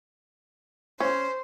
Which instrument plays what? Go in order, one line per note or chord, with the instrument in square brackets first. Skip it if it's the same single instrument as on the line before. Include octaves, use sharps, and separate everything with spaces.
[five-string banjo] C#4 [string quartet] C5